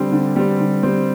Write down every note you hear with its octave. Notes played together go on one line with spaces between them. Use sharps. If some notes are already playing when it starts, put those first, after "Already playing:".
Already playing: D3 G3 C4
D3
G3 C4
D3
G3 C4